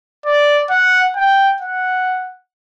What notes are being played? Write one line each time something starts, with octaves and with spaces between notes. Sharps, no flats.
D5
F#5
G5
F#5